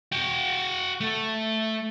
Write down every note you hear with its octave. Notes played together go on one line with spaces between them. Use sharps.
F#4 G5
A3